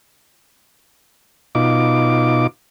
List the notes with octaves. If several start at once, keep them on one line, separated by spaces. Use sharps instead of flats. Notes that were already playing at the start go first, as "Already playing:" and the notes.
B2 D#4 F4 D6